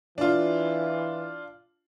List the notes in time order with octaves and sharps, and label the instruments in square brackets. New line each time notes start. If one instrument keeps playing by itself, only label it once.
[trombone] E3 [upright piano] D4 F4